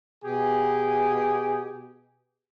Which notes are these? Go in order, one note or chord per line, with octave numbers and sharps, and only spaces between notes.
B2 G4 G#4